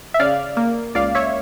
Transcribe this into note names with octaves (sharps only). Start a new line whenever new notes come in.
E5
C#3 D5 F5
A#3
C#2 D5 F5
C#5 E5